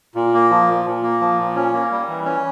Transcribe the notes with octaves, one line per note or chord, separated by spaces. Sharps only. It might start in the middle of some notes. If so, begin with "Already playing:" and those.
A#2
A#3
F3
A#2
A#2
A#3
F3
A#2
C#4
A#3
G3
E3
C#4